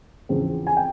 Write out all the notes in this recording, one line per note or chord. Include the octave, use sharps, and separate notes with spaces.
E2 C#3 F3 C4
G#5
G5